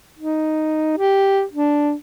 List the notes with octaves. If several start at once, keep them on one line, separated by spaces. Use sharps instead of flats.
D#4
G4
D4